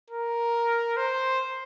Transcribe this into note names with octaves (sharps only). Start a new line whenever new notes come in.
A#4
C5